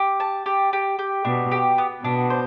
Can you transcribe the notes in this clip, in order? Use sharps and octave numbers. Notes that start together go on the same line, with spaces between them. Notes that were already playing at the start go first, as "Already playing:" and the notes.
Already playing: G4
A5
G4
G4
G4
B2 D4
G4
B3
B2 D4
C5